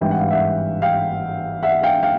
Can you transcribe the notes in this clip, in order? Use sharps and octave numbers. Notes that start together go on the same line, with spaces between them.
G#1 G2 E3 G5
F#5
F5
E5 F#5
F5 G5
E5 F#5
F5 G5
F5 G5